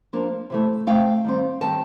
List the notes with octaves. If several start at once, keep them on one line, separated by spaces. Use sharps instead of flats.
F3 A#3 D4
C3 E3 A3
C3 E3 A3 F5 G5
D#3 G3 C4
D#3 G3 C4 G5 A5